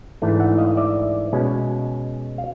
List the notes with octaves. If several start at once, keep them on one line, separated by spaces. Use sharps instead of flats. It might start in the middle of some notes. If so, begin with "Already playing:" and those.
G#2 E3 A3 D4
E5 F#5
D#5 F5
D5 E5
B2 G#3 C#4
F5